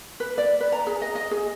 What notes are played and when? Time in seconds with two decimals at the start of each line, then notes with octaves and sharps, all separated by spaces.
0.20 B4
0.38 D5
0.60 B4
0.72 A#5
0.87 G#4
1.02 D#5
1.15 D#5
1.31 G#4